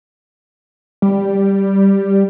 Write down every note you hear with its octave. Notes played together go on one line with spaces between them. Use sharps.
G3